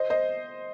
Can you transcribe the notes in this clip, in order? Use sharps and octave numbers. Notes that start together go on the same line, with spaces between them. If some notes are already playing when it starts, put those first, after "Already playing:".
Already playing: C5 D#5
C5 D#5